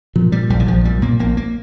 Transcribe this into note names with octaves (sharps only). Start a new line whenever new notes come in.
A#2 F3
A#2 G3
A#1 G3
D#3
A#1 F3
A#2 G3
A#2 A#3
A#1 A#3
A#3